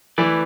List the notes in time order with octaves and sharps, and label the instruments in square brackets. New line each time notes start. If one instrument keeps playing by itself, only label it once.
[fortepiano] E3 [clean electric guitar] A3 E4 B4 D5